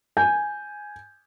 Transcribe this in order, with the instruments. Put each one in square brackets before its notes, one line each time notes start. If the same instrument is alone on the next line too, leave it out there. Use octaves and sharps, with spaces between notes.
[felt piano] G#5 G6